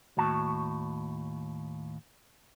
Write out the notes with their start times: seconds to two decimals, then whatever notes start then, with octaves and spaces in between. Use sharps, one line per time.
0.17 D#2 A2 F#4 A5